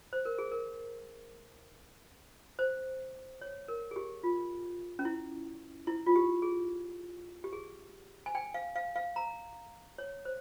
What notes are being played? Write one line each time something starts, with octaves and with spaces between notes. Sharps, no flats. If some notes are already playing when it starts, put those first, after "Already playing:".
C5
A#4
G#4
A#4
C5
C#5
A#4
G#4
G4
F4
C#4
E4
E4
F4
G4
G#4
G4
G#4
G#5
G5
F5
F5
F5
A#5
C#5
C5